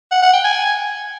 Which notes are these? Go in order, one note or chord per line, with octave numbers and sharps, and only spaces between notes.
F#5
F#5
G5
G#5